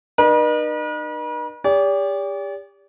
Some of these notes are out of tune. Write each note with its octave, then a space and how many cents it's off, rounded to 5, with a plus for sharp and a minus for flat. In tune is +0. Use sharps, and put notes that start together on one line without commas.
D#4 -40 B4 -45
G4 +40 D5 -40